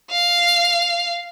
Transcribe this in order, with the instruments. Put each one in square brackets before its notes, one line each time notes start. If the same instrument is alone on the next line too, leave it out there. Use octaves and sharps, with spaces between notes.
[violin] F5